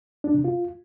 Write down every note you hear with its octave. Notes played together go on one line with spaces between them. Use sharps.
D4
C3
F4